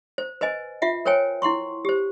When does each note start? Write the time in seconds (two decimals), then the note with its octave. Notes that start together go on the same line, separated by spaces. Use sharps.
0.18 C5
0.41 B4 C5 D#5 G#5
0.82 F4 E5 F#5
1.05 A#4 C5 C#5 G5 G#5
1.42 E4 F#5 C6 C#6
1.85 G4 C5